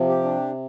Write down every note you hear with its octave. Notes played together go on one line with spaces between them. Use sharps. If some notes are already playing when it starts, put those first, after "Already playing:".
Already playing: C3 F3
G4
D4